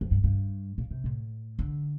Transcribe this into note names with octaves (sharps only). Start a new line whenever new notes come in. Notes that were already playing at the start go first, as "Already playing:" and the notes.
F2
G2
G2
A#2
C3
A2
D3